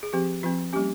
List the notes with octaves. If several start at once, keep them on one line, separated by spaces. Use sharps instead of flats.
G#4
F3 C4 G4
F3 C4 F4
G3 A#3 C#4 G4